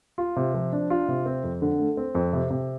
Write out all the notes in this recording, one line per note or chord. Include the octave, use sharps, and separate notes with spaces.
F4
C3
F3
D4
F4
C3
C4
F2
D3
A3
C4
F2
C3
C3